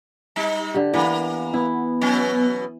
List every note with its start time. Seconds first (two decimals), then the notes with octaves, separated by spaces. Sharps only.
0.36 G3 D#4
0.74 D3 G4
0.93 E3 A#3 B3
1.53 B3 E4
2.01 B2 F#3 C#4